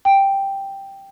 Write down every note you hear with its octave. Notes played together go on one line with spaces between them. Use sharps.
G5